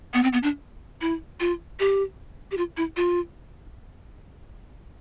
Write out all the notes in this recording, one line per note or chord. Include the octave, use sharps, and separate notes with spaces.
B3
C4
B3
D4
E4
F4
G4
G4
F4
E4
F4